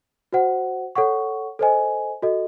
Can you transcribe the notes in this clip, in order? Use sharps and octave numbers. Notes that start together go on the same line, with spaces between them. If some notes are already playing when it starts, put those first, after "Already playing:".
F#4 C5 F#5
A4 C#5 F#5 C#6
A4 C5 D#5 G#5
F#4 A4 D#5